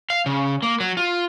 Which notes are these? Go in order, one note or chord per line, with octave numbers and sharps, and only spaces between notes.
F5
C#3
A#3
F#3
F4